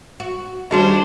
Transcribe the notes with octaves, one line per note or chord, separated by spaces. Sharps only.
F#4
D#2 G3 C#4 D4 F#4 G#4 C5 D#5